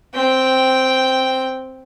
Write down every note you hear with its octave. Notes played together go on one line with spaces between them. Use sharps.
C4 G5